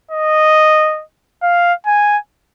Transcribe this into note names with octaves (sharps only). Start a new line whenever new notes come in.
D#5
F5
G#5